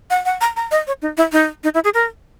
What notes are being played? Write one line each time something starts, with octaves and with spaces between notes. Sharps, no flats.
F#5
F#5
A#5
A#5
D#5
C#5
D#4
E4
D#4
D#4
E4
G#4
A#4